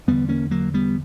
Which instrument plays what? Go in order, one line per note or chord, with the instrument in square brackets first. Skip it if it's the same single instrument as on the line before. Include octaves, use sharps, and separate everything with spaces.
[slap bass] E1 E2 D3 G3 B3
A#3 C#4
F#3 A#3
G3 B3